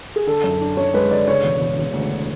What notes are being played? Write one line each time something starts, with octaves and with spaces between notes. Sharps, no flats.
G#4
D3 A4
F#2
D4
F#2 C#5
G#3 B4
D3 D5
C#3 C#5
E1
E1
E1
D2